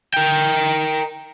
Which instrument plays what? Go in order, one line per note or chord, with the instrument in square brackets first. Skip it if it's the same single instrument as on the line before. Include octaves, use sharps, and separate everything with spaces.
[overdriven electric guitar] A#4 G5